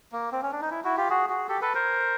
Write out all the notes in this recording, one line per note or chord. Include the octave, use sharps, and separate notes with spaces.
A#3
C4
C#4
D4
D#4
E4
E4 F#4
F4 G4
F#4 G#4
F#4 G#4
G4 A4
A4 B4
A#4 C5